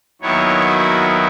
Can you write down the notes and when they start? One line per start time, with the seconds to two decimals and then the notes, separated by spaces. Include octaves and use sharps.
0.22 D#2 D#3 F#3 B3 E4 C#5
0.62 F#4